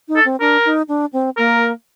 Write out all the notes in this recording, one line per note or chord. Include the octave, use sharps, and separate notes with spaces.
D#4
A4
C4
D4 A#4
D#4
D4
C4
A#3 A#4